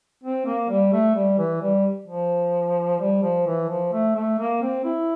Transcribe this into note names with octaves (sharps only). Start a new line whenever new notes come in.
C4
A#3
G3
A3
G3
E3
G3
F3
G3
F3
E3
F3
A3
A3
A#3
C4
E4